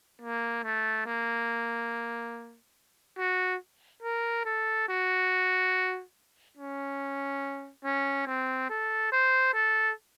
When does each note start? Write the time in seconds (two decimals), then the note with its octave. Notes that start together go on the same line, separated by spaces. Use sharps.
0.22 A#3
0.64 A3
1.06 A#3
3.18 F#4
4.03 A#4
4.46 A4
4.88 F#4
6.57 C#4
7.84 C#4
8.27 C4
8.70 A4
9.12 C5
9.54 A4